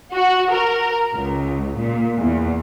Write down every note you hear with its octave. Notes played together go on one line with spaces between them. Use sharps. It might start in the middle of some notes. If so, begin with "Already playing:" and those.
F#4
A#4
C#2
A#2
E2